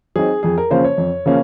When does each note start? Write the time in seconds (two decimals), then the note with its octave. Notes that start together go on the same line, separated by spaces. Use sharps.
0.16 F#3 C4 D#4 G#4
0.43 F2 G#4
0.58 A#4
0.70 C#3 F3 A#3 C#4 C5
0.84 C#5
0.98 F2
1.26 C#3 F3 A#3 C#4